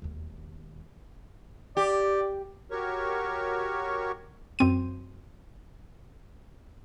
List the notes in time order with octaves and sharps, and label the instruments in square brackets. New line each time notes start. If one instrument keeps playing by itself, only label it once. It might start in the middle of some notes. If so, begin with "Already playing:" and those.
[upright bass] E1 D#2
[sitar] G4 [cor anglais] D5
[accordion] F#4 G4 A#4 C#5 C#6
[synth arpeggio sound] F#2 C4 D#7